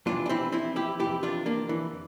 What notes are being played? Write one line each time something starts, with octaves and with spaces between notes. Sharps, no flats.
F2 C3 E3 D4 F4
D4
C4 E4
C4 E4
E4 G4
F2 C3 E3 E4 G4
D4 F4
A#3 D4
E3